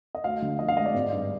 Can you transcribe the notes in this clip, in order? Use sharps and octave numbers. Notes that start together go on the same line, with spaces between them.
D#5
D2 F5
D3
F3 D#5
F5
G#3 D#5
D5
G#1
G2